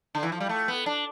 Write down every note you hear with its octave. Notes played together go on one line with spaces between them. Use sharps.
D3
E3
F3
G3
A3
B3
D4